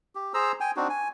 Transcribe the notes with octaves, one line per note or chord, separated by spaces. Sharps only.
G4
G#4 C5 A#5 E6
G5 G#5
C4 D4 D#4 F#4
G#5